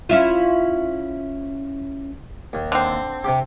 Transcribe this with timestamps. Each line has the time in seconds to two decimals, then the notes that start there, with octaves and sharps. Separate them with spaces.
0.09 C#4 E4 F4
2.53 D#2
2.72 D3 C4
3.24 C3 G4